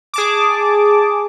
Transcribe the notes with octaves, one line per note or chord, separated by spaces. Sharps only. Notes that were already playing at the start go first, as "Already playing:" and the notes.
G#4 A5 D6